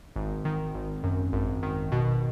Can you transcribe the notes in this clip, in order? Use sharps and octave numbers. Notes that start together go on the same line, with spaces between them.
G#1
D#3
G#1
F#2
G#1
D#3
B2